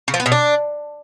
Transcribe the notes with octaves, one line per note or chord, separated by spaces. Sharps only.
C#3
F3
B3
B2
D4